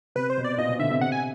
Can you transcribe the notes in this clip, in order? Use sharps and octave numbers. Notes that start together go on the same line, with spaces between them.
C3 B4
C5
B2
D5
A#2 D#5
B2
D3 E5
C3
C3 F#5
G#5